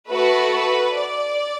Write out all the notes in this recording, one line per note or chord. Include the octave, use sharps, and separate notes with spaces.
A3 F#4 A4 B4
B4
D5